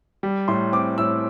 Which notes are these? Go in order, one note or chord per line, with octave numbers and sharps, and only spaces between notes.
G3
A2 C6
C4 D6
A2 E6